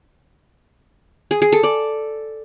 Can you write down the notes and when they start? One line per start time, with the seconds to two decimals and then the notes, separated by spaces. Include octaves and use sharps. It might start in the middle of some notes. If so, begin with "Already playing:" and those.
1.31 G#4
1.42 G#4
1.52 A4
1.63 D5